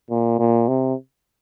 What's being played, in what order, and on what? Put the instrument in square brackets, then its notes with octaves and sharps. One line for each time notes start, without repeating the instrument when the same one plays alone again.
[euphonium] A#2
A#2
C3